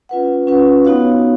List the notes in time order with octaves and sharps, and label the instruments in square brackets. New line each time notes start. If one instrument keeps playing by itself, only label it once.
[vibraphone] C#4 F4 B4 F#5
C#4 F4 B4 F#5
B3 D#4 F#4 C#5 F5